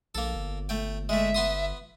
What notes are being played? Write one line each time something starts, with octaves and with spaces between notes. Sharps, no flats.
A#1 A#3 A4
G1
A3 G5
G#3 A3 E5
B3 C6 D#6